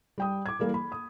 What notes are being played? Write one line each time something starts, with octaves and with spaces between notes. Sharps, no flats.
G3 G5 D#6
D6 G#6
E3 G3 A#3 A4
B5
D#6